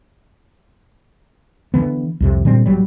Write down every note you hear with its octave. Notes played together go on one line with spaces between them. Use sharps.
D3 E3 B3
C2 F2 C3
A#2 D3 G3 C4
A#1 A2 F#3 G3